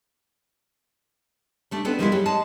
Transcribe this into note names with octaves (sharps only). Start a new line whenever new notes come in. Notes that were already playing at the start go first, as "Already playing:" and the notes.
G3 A3 D4
B3 C4 D4 A4 B4
D#3 F3 G3 G#3 B3 E4
F#3 G3 G4
G#3 A5